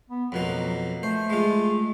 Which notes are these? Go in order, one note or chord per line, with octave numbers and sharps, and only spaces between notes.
B3
F2 B2 F#3 A#3
A3 C5
G#3 F4